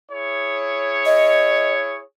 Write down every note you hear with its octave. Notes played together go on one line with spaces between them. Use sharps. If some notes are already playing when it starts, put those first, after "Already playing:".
E4 G#4 C#5
D#5